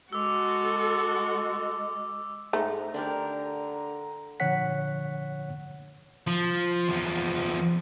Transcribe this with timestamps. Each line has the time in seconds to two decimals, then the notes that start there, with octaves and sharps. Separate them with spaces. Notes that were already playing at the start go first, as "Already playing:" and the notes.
0.13 G#3 F#4 A4 D6 E6
2.53 G#2 A3 A#5
2.94 D3 D4 G4 A#4
4.40 A#2 D3 F3 C#5 F#5 B6
6.27 F3
6.88 E2 F3